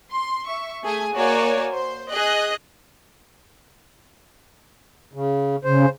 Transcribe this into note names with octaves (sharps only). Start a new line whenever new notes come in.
C6
E5 C#6
A3 G#4 G#5
A#3 F#4 C#5 D5 G#5
C5
G#4 D#5 F#6
C#3
C#3 C5